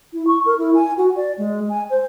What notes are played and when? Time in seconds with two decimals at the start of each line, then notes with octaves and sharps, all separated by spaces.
0.13 E4
0.27 C#6
0.46 A#4
0.58 E4
0.74 G#5
0.97 F#4
1.16 D5
1.38 G#3
1.69 G#5
1.90 C5